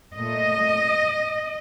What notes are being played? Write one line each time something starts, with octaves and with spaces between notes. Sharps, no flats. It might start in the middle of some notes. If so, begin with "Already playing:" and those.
A#2 A3 D#5